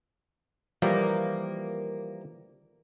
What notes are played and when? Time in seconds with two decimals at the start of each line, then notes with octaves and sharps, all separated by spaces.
0.82 E3 F3 G3 A#3